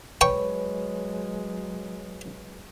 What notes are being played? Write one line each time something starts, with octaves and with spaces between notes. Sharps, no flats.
F#3 G#3 B4 C#5 G5 C#6